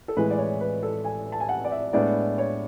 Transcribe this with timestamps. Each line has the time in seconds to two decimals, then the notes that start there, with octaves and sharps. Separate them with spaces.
0.08 A4
0.17 A2 E3 G#3 B4
0.31 D5
0.39 C#5
0.60 B4
0.83 A4
1.05 G#5
1.32 A5
1.40 G#5
1.49 F#5
1.65 D5
1.71 E5
1.93 A2 G#3 B3 D4 D5
2.38 C#5